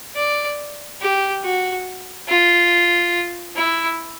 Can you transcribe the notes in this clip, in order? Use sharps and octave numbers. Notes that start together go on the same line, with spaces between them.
D5
G4
F#4
F4
E4